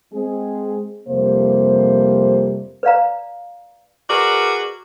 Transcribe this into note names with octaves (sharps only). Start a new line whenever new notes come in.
G#3 C4 G#4
F2 C3 G3 A#3 C5
B4 D5 F5 A#5
F#4 G#4 A#4 B4 D5